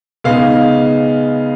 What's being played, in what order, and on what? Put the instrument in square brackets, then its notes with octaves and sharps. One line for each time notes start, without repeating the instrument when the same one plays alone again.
[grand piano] C#3 G#3 B3 D#4 F5